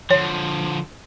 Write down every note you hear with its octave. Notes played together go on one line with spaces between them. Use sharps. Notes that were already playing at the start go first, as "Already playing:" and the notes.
D3 F3 C#5